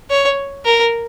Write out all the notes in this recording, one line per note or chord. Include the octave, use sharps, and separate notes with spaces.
C#5
A#4